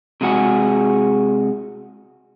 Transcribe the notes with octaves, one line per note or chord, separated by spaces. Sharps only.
C3 G#3 F#4 G#4